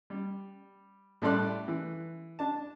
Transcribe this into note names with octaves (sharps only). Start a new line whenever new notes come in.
G3
A2 G3 A3 D5 C6 F#6
E3
D4 A5